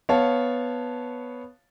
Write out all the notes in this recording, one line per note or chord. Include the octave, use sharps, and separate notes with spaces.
B3 C#5 F5 A5